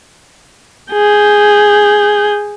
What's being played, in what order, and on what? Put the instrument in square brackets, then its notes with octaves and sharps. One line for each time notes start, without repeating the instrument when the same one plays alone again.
[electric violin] G#4 G6